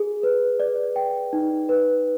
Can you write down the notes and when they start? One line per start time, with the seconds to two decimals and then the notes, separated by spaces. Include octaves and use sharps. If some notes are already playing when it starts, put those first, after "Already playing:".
Already playing: G#4
0.23 B4
0.60 D5
0.96 G5
1.33 D#4
1.69 B4